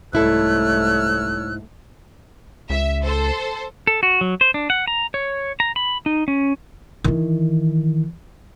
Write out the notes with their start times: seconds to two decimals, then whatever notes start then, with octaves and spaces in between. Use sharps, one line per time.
0.13 C2 G#2 A3 E4 A4 C#5 E6 F#6
2.70 C#2 E5
3.04 A4 C5 A5
3.87 A4
4.03 F#4
4.21 F#3
4.41 C5
4.54 D4
4.70 F#5
4.88 A#5
5.14 C#5
5.60 A#5
5.76 B5
6.06 D#4
6.28 C#4
7.04 D#3 E3